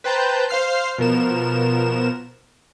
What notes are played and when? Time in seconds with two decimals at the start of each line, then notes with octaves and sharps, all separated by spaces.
0.04 B4 C5 G5 A5 A#5 G6
0.49 C5 F5 F6 C7
0.98 B2 F3 A#4 E7